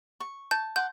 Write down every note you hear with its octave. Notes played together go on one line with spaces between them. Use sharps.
C#6
A5 G6
F#5 C6 D6 G6